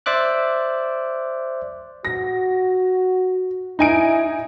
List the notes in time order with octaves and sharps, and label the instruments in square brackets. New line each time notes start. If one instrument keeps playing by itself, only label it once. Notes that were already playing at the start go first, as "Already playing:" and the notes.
[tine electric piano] C5 D5 E5 D6 F#6
[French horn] F#4 [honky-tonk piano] A#6
[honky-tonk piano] D#4 G#5 D7 [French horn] E4